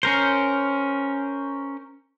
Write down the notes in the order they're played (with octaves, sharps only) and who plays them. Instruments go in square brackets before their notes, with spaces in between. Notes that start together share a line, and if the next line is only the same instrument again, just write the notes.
[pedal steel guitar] C#4 A#4 C5